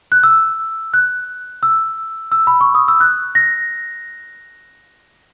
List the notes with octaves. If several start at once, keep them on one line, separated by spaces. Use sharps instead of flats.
F#6
E6
F#6
E6
E6
B5
C#6
D#6
E6
F#6
A#6